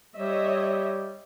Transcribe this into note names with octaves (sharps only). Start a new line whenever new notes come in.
G3 C#5 D#5 E5